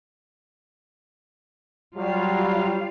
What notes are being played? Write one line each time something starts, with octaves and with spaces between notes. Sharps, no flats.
F#3 G3 F4 F5